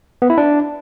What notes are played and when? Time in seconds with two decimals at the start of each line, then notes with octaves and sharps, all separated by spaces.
0.22 B3
0.30 E4
0.38 D4